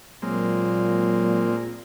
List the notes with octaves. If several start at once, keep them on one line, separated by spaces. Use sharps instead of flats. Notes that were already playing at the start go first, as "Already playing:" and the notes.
A#2 F#3 G#3 A#3 C4